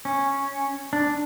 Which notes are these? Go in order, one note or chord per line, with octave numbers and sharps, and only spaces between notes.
C#4
D4